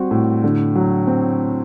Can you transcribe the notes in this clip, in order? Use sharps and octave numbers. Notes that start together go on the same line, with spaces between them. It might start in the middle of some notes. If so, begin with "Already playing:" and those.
Already playing: G3 C4 F#4
A2
D3
F#3
C4